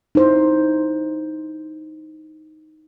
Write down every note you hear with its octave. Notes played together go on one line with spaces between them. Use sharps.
D#4 E4 C5